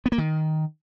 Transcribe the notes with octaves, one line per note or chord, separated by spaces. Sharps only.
B3
A#3
D#3